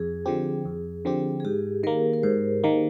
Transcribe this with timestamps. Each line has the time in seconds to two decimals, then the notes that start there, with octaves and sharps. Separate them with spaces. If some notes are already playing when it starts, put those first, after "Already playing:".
Already playing: F2 G#4
0.26 D3 F3 C4 G4
0.65 F2
1.05 D3 F3 C4 G4
1.40 G#4
1.45 G#2 G4
1.83 D#3 A#3 A#4
2.13 A#4
2.23 G#2 C5
2.64 D#3 A#3